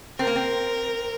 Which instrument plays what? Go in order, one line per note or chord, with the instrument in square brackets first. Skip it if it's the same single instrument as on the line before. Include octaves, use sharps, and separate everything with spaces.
[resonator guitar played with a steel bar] C4 [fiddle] A#4
[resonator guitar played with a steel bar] A#3
C4